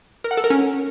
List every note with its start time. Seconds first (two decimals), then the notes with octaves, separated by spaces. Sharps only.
0.24 A#4
0.31 F#5
0.37 A4
0.44 A#4
0.50 C#4